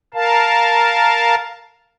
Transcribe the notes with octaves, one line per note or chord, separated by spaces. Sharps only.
A#4 F5 A5